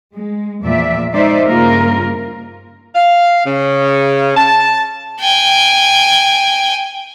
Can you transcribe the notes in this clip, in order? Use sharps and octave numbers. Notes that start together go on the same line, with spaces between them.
G#3
E2 A#2 F3 D5 E5
G#3 D#4 C5 D5 E5
G2 C#3 A#3 F4 A#4
F5
C#3
A5
G5 G#5